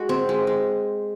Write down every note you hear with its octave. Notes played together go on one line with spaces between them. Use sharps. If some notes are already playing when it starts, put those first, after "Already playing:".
Already playing: G#3 F#4
C4
G#3
G#3